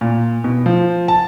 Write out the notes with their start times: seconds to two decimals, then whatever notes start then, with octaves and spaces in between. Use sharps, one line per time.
0.01 A#2
0.44 B2
0.66 F3
1.08 A5